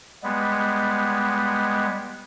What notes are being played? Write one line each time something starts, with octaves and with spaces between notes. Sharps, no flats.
G3 G#3 B3